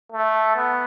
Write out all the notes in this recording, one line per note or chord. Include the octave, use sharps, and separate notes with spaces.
A3
B3